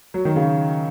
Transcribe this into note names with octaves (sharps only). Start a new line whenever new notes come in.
F#3
D#3
C#3